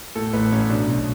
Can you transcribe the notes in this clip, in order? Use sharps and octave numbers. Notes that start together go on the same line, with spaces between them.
A2 A4
A1 B4
A1 C#4
B2 D4
B1